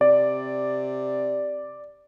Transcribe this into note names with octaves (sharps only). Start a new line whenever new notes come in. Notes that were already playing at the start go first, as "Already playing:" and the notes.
C3 D5